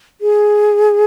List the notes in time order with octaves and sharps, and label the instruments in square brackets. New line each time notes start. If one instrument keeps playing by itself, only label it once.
[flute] G#4